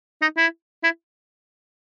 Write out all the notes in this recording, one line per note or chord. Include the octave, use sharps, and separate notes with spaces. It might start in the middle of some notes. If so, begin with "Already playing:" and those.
D#4
E4
E4